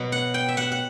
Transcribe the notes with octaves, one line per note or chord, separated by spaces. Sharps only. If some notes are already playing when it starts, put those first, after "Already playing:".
Already playing: B2 F#3
F#5
G5
E5
F#5
F#5